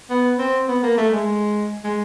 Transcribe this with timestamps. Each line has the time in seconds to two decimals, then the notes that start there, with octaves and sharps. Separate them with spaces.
0.10 B3
0.39 C4
0.68 B3
0.83 A#3
0.97 A3
1.12 G#3
1.84 G#3